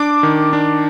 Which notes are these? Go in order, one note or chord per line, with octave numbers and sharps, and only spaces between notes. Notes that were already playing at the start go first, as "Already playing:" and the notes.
Already playing: D4 D6
D#3
D4